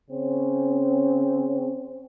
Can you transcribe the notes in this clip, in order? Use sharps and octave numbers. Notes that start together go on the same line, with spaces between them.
C#3 C4 C#4